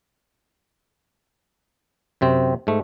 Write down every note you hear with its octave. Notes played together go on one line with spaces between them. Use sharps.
F#2 C3 C4
G#2 A3